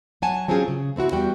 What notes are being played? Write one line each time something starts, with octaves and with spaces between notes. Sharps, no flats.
F#3 F#5 G#5 A5
F#3 C4 C#4 F4 G#4
C#3
A3 C4 E4 F#4
E2 G3 F#4 G5